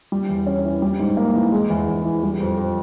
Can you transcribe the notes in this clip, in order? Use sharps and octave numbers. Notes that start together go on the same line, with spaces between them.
G3
E2
C#4
E3
G3
G#2
A#3
E3
G#3
E2
E2
E3
G3
F2
F2